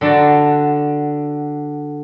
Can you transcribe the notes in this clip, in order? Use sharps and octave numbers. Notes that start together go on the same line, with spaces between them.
D3 D4 F#4 A5 A#5